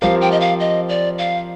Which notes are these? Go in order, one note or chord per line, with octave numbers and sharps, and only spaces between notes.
F3 C4 G4 A#4 F5
G5
D#5
F5
D#5
D5
F5